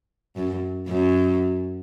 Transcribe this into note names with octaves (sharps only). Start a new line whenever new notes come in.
F#2
F#2